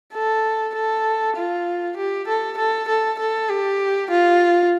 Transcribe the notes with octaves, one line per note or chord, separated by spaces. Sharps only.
A4
A4
F4
G4
A4
A4
A4
A4
G4
F4